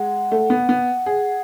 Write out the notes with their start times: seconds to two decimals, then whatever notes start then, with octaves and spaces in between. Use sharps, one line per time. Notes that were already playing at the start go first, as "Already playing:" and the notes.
Already playing: G#3 F#5
0.32 A3
0.50 B3
0.69 B3
1.06 G#4